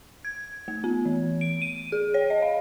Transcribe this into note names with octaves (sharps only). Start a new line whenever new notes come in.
G#6
A3
B3
E3
D7
D#7
G#4
C#5
D#5
F5